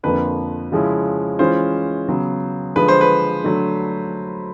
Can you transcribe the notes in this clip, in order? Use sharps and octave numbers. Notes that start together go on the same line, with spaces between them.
F2 D3 F3 A#3 B4
C#3 F3 G#3 C#4 E4
E3 G#3 C#4 F4 C5
C#3 F#3 B3
D3 F3 G#3 B4
C5
B4
D3 F#3 A3